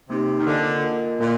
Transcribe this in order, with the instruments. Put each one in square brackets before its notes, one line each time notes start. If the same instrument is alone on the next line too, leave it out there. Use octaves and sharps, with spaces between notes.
[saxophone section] C3 [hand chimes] A#3 D#4 G4
[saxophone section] D#3
[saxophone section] D3 [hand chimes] A#3 F4 A#4 D#5 G#5
[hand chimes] A#3 F4 A#4 D#5 G#5
[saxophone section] A#2 [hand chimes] A#3 F4